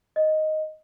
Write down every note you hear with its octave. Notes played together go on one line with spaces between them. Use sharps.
D#5